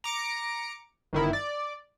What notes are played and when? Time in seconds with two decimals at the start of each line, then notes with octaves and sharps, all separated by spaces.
0.04 A#5 D6 C#7 D7
1.13 G1 D#3 E4
1.33 D5